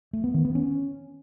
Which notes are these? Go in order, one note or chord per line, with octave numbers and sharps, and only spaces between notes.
A3
B3
D#3
B3
C#4